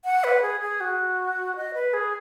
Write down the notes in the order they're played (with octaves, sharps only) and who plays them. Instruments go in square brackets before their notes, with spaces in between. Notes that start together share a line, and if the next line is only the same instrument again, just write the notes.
[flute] F#5
B4
G#4
G#4
F#4
D#5
B4
G#4